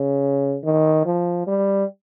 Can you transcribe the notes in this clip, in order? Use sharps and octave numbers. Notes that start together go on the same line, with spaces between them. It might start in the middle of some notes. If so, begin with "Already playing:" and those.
Already playing: C#3
D#3
F3
G3